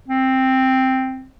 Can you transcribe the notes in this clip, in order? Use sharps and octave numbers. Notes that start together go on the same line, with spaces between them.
C4